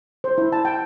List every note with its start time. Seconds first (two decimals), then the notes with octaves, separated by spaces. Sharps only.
0.24 C5
0.38 E4
0.52 A5
0.65 G5